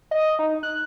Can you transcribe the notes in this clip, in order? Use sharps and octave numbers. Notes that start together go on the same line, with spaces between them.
D#5
D#4
F#6